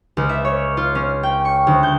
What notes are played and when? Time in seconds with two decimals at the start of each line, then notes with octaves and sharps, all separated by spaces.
0.17 C#2
0.29 E5
0.45 C#5
0.77 F4
0.95 C#4
1.23 G5
1.45 C#6
1.67 D2
1.83 G6